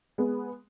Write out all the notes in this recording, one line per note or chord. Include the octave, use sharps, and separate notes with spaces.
G#3 B3